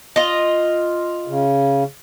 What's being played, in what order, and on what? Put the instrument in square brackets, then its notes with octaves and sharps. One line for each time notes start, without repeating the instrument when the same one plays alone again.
[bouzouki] F4 D#5
[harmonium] C#3